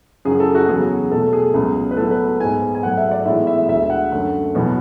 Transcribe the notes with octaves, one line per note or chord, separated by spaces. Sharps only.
F#2 C#3 F#3 G#4
A4
F#4
E2 C#3 F#3 B3 G#4
B2 A3 A4
G#4
C#2 C#3 F#3 B3
B4
A2 F#3 B3 A4
B4
G#2 G#3 B3 G#5
G#5
G#2 F#3 A3 F#5
E5
D5
A2 E3 G#3 B3 E5
E5
D2 D3 G#3 E5
F#5
F#2 D3 A3
E2 B2 F#3 B3